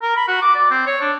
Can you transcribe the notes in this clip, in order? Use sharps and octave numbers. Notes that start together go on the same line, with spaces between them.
A#4
B5
F#4
D6
D5
C4
C#5
D4